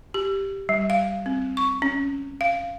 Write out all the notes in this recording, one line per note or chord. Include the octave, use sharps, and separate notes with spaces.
G4
G3
F5
C4
C#6
C#4
F5